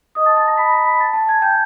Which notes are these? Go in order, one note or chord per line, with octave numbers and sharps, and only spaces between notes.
D#5 D#6
A5 A6
A5 A6
A#5 A#6
B5 B6
A#5 A#6
B5 B6
A5 A6
A5 A6
G#5 G#6
G5 G6